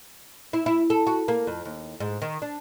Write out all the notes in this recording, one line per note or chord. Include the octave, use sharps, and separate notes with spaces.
E4
E4
A4
F#4
A#3
F2
D#2
G#2
D#3
D4